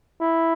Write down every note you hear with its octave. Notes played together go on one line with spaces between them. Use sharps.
E4